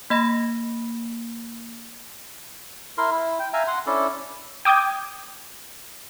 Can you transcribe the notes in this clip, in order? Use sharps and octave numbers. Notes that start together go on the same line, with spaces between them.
A#3 D#5 B5 A#6
E4 A#4 C6
E4
G5
E5 F5 G#5 A#5
F#5 C6
C#4 D4 E4 A4
G5 D6 D#6 G6 G#6